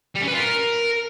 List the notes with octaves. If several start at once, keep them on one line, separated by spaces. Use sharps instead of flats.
G3
C#4
B4
F4
A#4